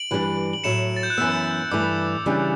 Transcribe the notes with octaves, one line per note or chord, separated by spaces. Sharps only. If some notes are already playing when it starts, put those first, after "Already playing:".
Already playing: D7 F#7
G2 E3 G3 D4
F#7
A2 F#3 A3 C#7 E7
A6
G6
F#6
F#2 E3 B3 E6
G2 E3 A3 E4 D6
C#3 E3 G3 D4